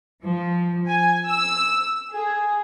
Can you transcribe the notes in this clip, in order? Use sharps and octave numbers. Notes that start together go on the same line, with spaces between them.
F3
G#5
E6
G#4